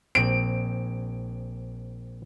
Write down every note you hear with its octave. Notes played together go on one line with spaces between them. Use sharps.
A#1 C4 D7